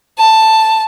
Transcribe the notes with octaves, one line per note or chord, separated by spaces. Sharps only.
A5